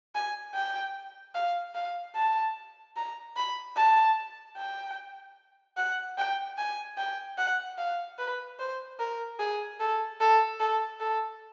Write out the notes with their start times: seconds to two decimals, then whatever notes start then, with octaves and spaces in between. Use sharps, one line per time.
0.15 G#5
0.55 G5
1.35 F5
1.75 F5
2.15 A5
2.97 A#5
3.36 B5
3.76 A5
4.57 G5
5.77 F#5
6.18 G5
6.58 G#5
6.98 G5
7.38 F#5
7.78 F5
8.18 B4
8.59 C5
9.00 A#4
9.39 G#4
9.80 A4
10.20 A4
10.60 A4
11.00 A4